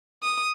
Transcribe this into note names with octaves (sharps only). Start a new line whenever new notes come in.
D#6